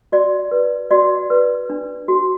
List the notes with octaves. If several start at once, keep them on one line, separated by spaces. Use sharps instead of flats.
F#4 D5
B4
F#4 D5
B4
D4
F#4